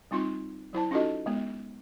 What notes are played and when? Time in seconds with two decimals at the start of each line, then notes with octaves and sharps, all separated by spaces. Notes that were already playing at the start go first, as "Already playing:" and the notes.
0.11 G3 C4 D#4 F4 C6
0.73 F#3 E4 C5 A5
0.91 C#4 D#4 F4 F#4 A4 D#5
1.26 G#3 B3